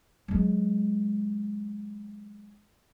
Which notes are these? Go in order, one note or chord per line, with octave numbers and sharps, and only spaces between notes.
F#3 G#3